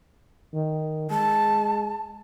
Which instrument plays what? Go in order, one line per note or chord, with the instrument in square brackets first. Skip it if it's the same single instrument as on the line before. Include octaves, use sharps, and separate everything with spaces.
[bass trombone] D#3
[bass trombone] G#3 [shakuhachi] A5